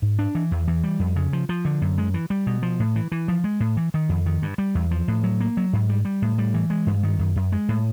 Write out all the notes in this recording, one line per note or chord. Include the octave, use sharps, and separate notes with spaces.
G#2
D4
E3
E2
E3
G3
F2
C#3
F3
F3
D3
F#2
G#3
E3
G3
B2
F3
A2
E3
E3
F3
G#3
A2
E3
D#3
F2
D#3
G2
G3
E2
F3
A2
F#3
A#3
F#3
G#2
G3
G3
A2
G3
E3
G#3
G2
D#3
F#2
F#2
G#3
A2